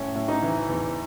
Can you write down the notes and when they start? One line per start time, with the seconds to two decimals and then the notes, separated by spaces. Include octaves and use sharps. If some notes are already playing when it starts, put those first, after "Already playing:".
Already playing: A2 C#4
0.15 A2
0.28 D#4
0.42 E3
0.69 E2